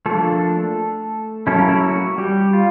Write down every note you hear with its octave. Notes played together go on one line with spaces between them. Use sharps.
F3 A3 A#3 D4 A4
F#3 A#3 C#4 E4 A4
A#4
A3 A4
F#4
G3 G4
F4